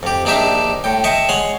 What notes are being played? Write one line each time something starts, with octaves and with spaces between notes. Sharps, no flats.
F2 G4
A#1 D4 D#4 G4 E5 A5
A2 G5
D#5 E5 G5 A5 C#6
G#3 C#5 F#5 C6